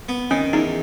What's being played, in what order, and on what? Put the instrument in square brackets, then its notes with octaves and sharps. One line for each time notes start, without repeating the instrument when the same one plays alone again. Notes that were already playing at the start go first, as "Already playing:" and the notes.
[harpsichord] B3
[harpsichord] D#3 [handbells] C#4
[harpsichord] E2 [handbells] D#4